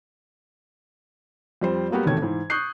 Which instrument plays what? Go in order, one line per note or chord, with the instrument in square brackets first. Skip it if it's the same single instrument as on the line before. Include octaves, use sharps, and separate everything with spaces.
[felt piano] F2 G3 C5
F#3 G3 A#3 B3 F#4 G4
E1 A1 C3 D#3 A3 G#6
G#2 E3
C#6 D#6 F#6 G6 C7